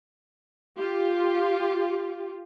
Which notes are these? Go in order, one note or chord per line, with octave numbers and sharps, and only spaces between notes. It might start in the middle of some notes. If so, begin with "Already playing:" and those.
F4 G4